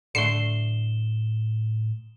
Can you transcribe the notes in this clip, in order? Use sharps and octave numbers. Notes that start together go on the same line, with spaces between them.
A2 D3 A3 C7 E7 G7